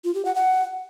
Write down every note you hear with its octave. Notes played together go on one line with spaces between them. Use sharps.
F4
G4
F#5
F#5